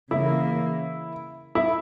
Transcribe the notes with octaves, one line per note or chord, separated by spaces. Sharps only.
C#3 E3 A#3 E4
E4